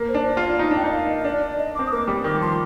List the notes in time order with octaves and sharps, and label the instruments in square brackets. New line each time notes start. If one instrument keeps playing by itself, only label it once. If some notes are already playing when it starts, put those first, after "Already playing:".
Already playing: [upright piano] A#3
[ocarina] C5
[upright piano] D4
[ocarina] C5
[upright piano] F4
[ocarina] D5
D5
[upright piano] D#4 [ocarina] D#5
[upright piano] D4 [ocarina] G5
[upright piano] D#4 [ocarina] D#5
[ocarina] F5
D#5
D#5
[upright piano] D4 [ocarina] D5
[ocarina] D5
D#5
[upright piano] C4 [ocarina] D6
[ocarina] D#6
[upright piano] A#3 [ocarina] D6
[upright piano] G3
[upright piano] D#3 [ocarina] D6
[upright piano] F3 [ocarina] C6